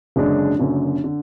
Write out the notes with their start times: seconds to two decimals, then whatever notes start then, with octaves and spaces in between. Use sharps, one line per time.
0.16 F#1 F#2 D3 G#3 D4
0.59 F#1 F#2 D3
1.04 D3